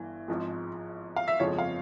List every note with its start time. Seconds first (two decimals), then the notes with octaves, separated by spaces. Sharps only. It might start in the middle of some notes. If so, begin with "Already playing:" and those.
Already playing: G1 G2 E3
0.28 G#1 G#2 F3 G#3
1.16 F5
1.28 E5
1.40 G1 F2 C#3 F3 G#3 C#5
1.59 F5